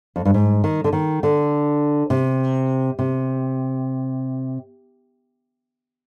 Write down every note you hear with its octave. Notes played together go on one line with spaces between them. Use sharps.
F2
G2
G#2
D#3
D3
D#3
D3
C3
C3